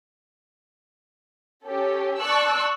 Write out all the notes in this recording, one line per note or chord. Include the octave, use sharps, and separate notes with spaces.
C#4 G4 A4
D5 A5 C#6 E6 F#6